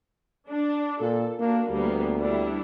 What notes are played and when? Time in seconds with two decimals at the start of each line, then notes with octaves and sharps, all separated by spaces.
0.49 D4
1.01 A#2 A4
1.40 A#3 D4 F#4
1.71 D2 G3 A#3 B3
2.20 G3 D4 E4